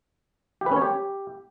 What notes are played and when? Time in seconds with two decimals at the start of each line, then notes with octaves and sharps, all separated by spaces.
0.61 G4
0.66 B4
0.71 C#4
0.76 C#5
0.81 G4